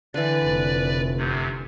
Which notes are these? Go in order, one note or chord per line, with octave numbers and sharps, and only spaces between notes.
D3 E3 B4 D5
F1
F#2 C3